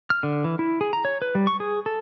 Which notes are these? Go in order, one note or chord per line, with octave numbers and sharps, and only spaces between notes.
F6
D3
E3
E4
G#4
A#5
C#5
B4
G3
C#6
G#4
A4